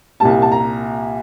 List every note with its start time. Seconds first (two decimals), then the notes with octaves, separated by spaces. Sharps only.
0.20 C2 A#2 G3 A5
0.42 A5
0.52 A#5